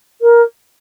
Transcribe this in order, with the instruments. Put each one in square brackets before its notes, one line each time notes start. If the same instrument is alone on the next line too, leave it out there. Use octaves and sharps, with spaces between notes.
[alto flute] A#4